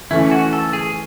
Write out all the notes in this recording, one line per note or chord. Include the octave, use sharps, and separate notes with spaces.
E3 A3 C#4 E4
F#4
A4
G#4